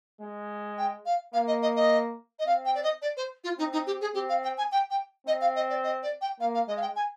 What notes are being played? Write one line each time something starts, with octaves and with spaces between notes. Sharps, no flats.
G#3
G5
F5
A#3 F5
D#5
D#5
D#5
D#5
C4 F5
G5
D5
D#5
D5
C5
F4
C4 D#4
D#4
G4
G#4
C4 G4
F5
G5
G#5
G5
G5
C4 D#5
F5
D#5
D5
D#5
D5
G5
A#3 F5
F5
G#3 D#5
F5
G5
G#5